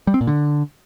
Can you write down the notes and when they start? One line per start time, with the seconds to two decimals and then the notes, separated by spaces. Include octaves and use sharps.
0.07 G3
0.14 C4
0.21 A#2
0.27 D3